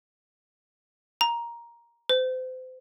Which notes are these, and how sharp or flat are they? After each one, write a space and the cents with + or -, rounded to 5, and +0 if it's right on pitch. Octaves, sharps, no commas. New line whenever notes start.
A#5 +10
C5 -35